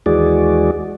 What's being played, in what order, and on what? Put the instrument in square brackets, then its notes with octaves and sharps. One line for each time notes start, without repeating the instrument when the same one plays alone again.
[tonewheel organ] D#2 E3 G#3 F#4 G#4 D5